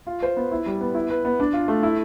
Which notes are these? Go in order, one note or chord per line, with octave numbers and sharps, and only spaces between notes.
F4
C5
B3
E4
G3
B3
E4
B4
B3
D4
F4
A3
E4